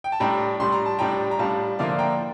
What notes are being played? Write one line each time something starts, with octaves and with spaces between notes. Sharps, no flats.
G5
A5
A2 G3 D4 G5 A#5
A2 G3 D4 C6
A#5
A5
A2 G3 D4 G5 A#5
A#5
A2 G3 D4 F5 A5
D3 F3 A#3 E4 D5 F5
G5 A#5